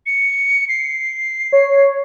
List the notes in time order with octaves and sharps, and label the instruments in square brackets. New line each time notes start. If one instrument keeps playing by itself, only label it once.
[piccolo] C#7
C7
[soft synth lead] C#5